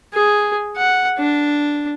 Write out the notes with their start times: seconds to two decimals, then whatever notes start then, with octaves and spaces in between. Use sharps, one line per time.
0.14 G#4
0.77 F#5
1.19 D4